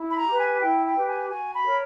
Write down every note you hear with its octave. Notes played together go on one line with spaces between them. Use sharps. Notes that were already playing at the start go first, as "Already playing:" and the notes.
Already playing: E4
B5
A#5
G4 B4
G#5
E4 G5
G5
G4 B4
G#5
F#4 G#5
B5
A#4 C#5